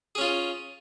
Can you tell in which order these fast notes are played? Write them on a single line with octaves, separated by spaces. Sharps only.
G#4 C#4 F4